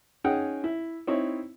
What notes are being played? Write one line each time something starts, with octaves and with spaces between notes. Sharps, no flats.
C#4 D#4 G#4 F#5 G5
E4
C4 D#4 E4 C#5